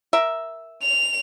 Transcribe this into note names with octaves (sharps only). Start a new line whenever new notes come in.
A#4 E5
F7